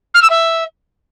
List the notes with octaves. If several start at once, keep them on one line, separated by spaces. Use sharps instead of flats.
F6
E6
E5